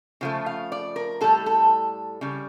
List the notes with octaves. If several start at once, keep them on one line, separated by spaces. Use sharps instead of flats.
C#3 F3 A3
F5
D5
A#4
A2 G3 A4
A4
C#3 G3